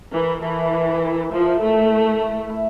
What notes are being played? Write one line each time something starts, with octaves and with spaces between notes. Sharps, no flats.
E3 A#4
E3 A3
E5
A#4
F3 E5
A3 E4
E4
E4
E4